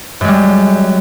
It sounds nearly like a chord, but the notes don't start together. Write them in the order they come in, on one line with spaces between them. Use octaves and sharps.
F#2 G#3 G3